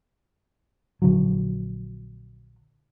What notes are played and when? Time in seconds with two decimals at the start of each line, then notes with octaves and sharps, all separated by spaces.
1.02 A#1 D3 F#3